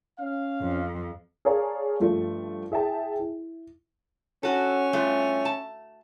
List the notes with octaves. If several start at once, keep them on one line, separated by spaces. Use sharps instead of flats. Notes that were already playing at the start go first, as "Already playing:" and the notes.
C#4 F5
F2
G#4 A#4 C#5 D5 F5 A5
G2 F3 A3
E4 G#4 E5 G5 A5
E4
C#4 F#4 A4
G2 A3 F4
A5